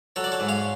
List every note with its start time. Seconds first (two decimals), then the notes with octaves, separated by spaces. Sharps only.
0.16 F#3 A4 C#5
0.24 D5
0.32 A4 C#5
0.40 G#2
0.49 C#5 F5